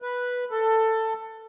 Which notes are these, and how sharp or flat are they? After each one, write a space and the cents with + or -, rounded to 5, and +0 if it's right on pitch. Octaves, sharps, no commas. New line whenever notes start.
B4 -5
A4 +15